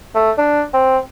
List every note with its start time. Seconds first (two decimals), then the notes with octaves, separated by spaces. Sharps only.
0.15 A3
0.38 D4
0.74 C4